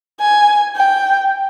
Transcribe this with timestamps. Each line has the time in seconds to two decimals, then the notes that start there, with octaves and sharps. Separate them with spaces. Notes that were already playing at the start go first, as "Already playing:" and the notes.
0.20 G#5
0.76 G5